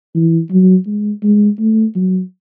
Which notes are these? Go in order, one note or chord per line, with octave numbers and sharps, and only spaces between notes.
E3
F#3
G#3
G#3
A3
F#3